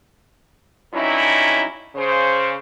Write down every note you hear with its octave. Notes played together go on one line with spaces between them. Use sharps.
G2 F#3 C#4 D#4 E4
C#3 C5